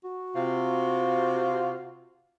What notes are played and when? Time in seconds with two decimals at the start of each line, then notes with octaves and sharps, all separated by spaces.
0.04 F#4
0.35 C3 F4